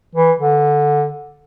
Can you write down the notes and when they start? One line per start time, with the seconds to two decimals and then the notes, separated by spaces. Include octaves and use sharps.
0.15 E3
0.39 D3